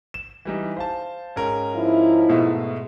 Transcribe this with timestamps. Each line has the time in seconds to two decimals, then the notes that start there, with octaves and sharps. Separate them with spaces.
0.14 E7
0.45 E3 G3 D#4
0.77 C5 F5 A5
1.36 G#2 C#4 A#4
1.76 F3 D#4 E4
2.28 G#2 B2 A3